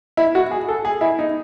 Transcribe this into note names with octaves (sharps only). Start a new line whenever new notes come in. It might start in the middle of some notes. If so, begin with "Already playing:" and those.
E4
F#4
G#4
A4
G#4
E4
D#4